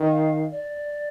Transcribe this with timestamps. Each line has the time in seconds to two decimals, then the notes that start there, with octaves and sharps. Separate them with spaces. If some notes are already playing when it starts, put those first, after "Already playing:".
Already playing: D#3
0.10 F5
0.52 D5